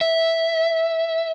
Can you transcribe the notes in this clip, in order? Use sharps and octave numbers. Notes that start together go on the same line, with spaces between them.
E5